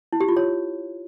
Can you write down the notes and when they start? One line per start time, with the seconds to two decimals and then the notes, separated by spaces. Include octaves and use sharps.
0.13 E4
0.21 G4
0.29 F4
0.37 C#5